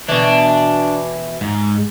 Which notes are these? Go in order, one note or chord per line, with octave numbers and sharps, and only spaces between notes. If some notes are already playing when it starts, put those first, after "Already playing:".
B2 E3 D4
G#2